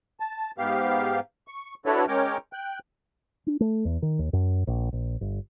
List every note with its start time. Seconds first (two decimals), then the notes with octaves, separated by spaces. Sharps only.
0.20 A5
0.58 G#2 B3 G4 F5
1.48 C#6
1.86 D4 E4 F#4 A4 B4 C#5
2.08 G#3 C#4 A#4 C#5 G5 D6
2.53 G5 F#6
3.47 D4
3.60 A3
3.85 E2
4.02 D#3
4.19 D#2
4.33 F#2
4.67 A#1
4.93 A#1
5.21 G1